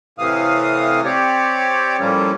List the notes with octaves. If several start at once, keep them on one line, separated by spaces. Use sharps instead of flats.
A2 C3 E3 F5 D#6
C4 G4 C#5 D5
A2 F3 G3 A#3 C#4